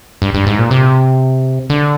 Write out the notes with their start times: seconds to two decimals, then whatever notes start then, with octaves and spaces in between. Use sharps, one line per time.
0.22 G2
0.34 G2
0.47 G#2
0.59 A#2
0.71 C3
1.70 D3